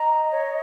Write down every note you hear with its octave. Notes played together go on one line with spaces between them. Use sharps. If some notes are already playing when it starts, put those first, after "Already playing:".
Already playing: D#5 A#5
C#5